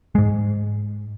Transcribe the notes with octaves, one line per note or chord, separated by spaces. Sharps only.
G#2 G#3